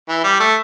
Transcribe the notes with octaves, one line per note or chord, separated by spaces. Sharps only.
E3
G3
A3